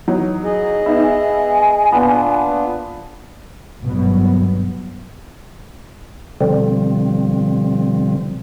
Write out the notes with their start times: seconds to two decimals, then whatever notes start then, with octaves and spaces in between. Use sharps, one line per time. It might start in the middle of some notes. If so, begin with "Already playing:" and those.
0.08 E3 F#3 D#4
0.44 G#4 D#5
0.86 B3 D#4 E5
1.00 G#5
1.92 A#2 B3 D4 F4
3.83 G#1 G2 B2 F#3 B3
6.41 B2 D3 F3 G3 C4